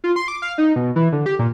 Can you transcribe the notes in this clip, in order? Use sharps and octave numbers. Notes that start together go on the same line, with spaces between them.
F4
C6
D6
F5
D#4
B2
E3
D3
G4
A#2